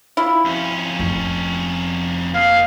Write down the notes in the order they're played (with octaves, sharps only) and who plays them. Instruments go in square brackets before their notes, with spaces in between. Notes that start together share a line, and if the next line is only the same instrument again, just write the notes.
[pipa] E4 F4
[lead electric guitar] F2 C#4
[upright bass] F1
[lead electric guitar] A#3 D#5 [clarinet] F5